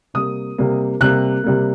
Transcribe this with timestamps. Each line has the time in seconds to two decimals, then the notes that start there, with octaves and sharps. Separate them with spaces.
0.14 C3 G3 A#3 D#6
0.58 C3 G3 A#3
1.01 C3 G3 A#3 F#6
1.44 C3 G3 A#3